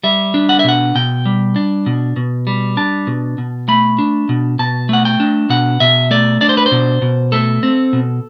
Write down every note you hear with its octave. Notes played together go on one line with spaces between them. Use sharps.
G3 E5
D4
F#5
E5
B2 F#5
B2 G5
G3
D4
B2
B2
G3
D4 A5
B2
B2
A3 B5
D4
B2
B2 A5
A3 F#5
G5
D4
B2 F#5
B2 E5
A3 D5
D4 D5
C5
B4
C5
B2
B2
A3 A4
C4
B2